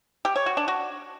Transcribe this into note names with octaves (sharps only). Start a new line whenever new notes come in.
G4
C#5
F#4
D4
F#4